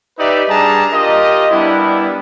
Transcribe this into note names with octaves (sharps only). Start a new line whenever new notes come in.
D#4 G4 B4 D5 E5
G3 D4 G#4 A5 A#5
F4 G4 A#4 D#5
G3 B3 D4 E4